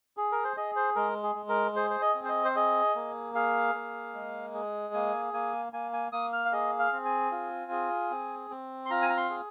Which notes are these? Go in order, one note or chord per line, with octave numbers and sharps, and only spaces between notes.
G#4
A#4
C5
G#4 D#5
C5
G#3 A#4
G#4
G#3
A#4
G#4 C5
C5
D#5
C4
C5
D#5
C5
G#4 D#5
A#3
G#4 F5
A#3
G#3
G#4
A#3 G#5
A#3 G#5
A#3 G#5
G#5
A#3 D#6
F6
F5
G#4 D#5
F5
C4
G#5
F4
G#4
C4
C4
C6
F4 A#5
G#5
A#5
C6
G#4